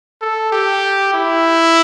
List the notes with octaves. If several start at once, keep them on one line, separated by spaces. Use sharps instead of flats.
A4
G4
E4